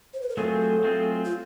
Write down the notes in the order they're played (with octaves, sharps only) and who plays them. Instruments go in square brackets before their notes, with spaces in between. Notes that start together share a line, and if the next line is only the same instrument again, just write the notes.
[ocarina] C5
B4
A#4
[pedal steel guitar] F#3 A3 C4 F4 G#4 [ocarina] A4
[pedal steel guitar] F#3 A3 C4 F4 G#4
[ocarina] F4